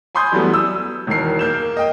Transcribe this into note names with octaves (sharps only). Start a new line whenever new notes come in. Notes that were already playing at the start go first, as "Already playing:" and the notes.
G#5 B5 C6 D#6 G6 G#6
F#2 E3 F#3 G3 A3 B3
D#6 E6
E1 D#3 E3 A#4 C7
A#3 G6 E7
D#5 G5